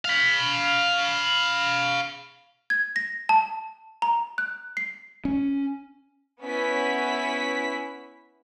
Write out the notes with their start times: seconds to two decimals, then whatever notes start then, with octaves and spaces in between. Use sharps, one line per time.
0.05 F5 B5
2.70 G#6
2.96 A#6
3.29 A5
4.02 A#5
4.38 F#6
4.77 C7
5.25 C#4
6.42 B3 C#4 E4 B6